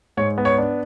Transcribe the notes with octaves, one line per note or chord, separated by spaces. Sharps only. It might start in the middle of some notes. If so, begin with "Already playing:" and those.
G#2 C#5
B3
C#5
D4